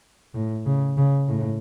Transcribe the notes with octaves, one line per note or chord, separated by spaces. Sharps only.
A2
C#3
C#3
A2